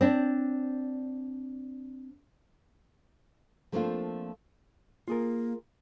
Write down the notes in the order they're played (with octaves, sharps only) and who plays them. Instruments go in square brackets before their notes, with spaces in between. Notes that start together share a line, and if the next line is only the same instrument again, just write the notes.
[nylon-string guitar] C4 D4
F3 A3 A#3 C4 D4 F4
[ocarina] A#3 [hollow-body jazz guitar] F4 G#4 A#4